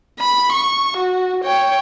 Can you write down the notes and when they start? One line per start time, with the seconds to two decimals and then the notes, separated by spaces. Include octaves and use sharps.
0.19 B5
0.52 C#6
0.97 F#4
1.44 C#5 G5